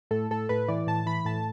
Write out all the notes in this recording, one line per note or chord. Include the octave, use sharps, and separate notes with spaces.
A2 A4
A2 A4
A2 B4
E3 D5
A2 A5
E3 B5
A2 A5